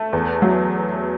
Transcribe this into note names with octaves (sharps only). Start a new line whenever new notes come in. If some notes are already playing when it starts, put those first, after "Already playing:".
Already playing: A3 A5
E2
F#3